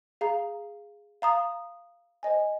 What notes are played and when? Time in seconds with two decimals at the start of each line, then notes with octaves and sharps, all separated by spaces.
0.21 G#4 F5 A#5
1.22 F5 A#5 D#6
2.23 C5 D#5 G#5